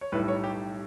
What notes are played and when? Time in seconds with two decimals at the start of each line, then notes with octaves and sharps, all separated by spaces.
0.01 C#5
0.12 B1 A2 G3 B4
0.28 C#5
0.44 G4